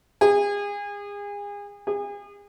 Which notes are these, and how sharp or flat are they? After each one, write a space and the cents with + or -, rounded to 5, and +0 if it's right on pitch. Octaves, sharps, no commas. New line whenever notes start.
G#4 -35
G#4 -40